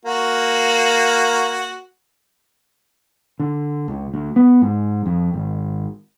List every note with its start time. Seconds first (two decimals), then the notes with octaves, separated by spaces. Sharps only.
0.05 A#3 F#4
3.40 D3
3.88 C#2
4.14 D2
4.36 B3
4.62 G#2
5.06 F2
5.34 G#1